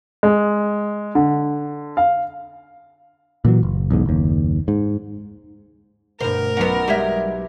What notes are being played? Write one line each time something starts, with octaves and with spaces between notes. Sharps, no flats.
G#3
D3
F5
A#2 E3 F#3
F#1
B1 E2 G#2
F#1 D#2
G#2
D2 G2 B2 A#4 C5
B1 B3 C#4 F#5
G3 G#3 G4 E5 G#6